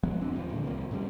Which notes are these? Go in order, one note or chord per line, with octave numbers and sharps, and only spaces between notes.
F#2 F3 G#3 B3
F3 C4 D4
D#2 A2 D#3 F3
A#2 D3
C2 C3 A#3
A2 C#3 F3 G3